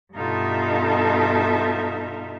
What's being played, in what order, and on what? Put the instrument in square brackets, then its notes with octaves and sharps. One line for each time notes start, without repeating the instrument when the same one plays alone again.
[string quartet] G2 B2 D#4 F4 A4 E5